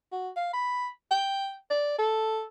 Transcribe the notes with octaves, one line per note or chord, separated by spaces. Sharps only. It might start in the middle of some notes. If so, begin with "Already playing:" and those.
F#4
F5
B5
G5
D5
A4